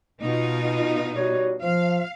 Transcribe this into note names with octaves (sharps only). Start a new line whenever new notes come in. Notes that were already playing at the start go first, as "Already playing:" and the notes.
B2 D#4 F4
G3 F#4 C#5
F3 F5